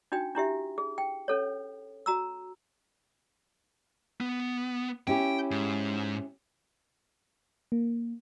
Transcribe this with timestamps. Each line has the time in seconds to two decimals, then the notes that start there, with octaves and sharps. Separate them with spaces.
0.12 D4 D#4 F#4 G5
0.35 D4 E4 G4 E5
0.78 G#4
0.98 G5
1.28 C#4 A4 C#5
2.06 F#4 A#5 E6
4.20 B3
5.07 C#4 E4 G4 G5
5.51 G#2
7.72 A#3